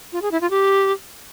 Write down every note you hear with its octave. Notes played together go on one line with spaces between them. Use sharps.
F4
G#4
E4
F4
G4